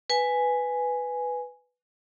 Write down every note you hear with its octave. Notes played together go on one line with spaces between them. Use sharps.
B4 G#5